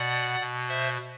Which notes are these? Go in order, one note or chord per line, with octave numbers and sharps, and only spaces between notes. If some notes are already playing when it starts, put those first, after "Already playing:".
Already playing: B2 D5 F#5
B2
C5 E5